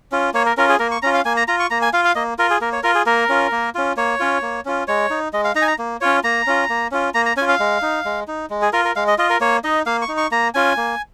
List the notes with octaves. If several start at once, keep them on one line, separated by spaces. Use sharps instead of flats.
C#4 F4
A#3 C#5
A#4
C#4 F4 A#4
G#4
A#3 A#4
C#6
C#4 F4 A#5
F5
A#3 G#5
A#5
F4 A#5
C#6
A#3 A#5
G#5
F4 F5
F5
A#3 D#5
F4 A#4
G#4
A#3 A#4
C#5
F4 A#4
G#4
A#3 A#4
C#4 F4
A#3
C#4 F4
A#3 C#5
C#4 F4
A#3
C#4 F4
G#3 C#5
D#4
G#3 D#5
F5
D#4 A#5
G#5
A#5
A#3
C#4 F4 C#5
A#3 A#5
C#4 F4
A#3
C#4 F4
A#3 A#5
A#5
C#4 F4 G#5
F5
G#3
D#4
G#3
D#4
G#3
G#4
F4 A#4
A#4
G#3 F5
D#5
F4 D#5
A#4
A#3 C#5
D#4 D#5
A#3 F5
C#6
D#4
C#6
A#3 A#5
C#4 F4 G#5
A#3